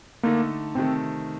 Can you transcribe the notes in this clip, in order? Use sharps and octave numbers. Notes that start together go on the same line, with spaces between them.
D3 A3 A#3 D#4 A4
C3 D#3 A3 C4